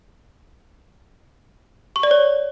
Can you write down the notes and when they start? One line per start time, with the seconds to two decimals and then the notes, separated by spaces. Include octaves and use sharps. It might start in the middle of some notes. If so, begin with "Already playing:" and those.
1.96 C#6
2.03 D5
2.11 C#5